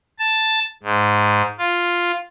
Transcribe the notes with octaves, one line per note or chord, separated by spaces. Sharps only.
A5
G#2
F4